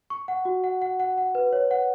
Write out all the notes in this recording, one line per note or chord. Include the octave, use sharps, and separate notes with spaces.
C#6
F#5
F#4
F#5
F#5
F#5
F#5
B4
C#5
F#5